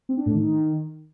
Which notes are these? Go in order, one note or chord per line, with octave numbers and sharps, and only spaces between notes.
C4
D4
A2
D#3